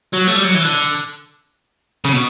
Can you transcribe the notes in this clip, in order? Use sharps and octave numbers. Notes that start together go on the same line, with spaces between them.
F#3
A3
G3
F#3
E3
D3
C#3
B2